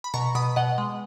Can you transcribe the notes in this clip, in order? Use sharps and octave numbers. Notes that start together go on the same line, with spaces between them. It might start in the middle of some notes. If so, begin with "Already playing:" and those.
B5
B2 A#5 C#6
B2 B5 D#6
B2 D#5 F#5
G#3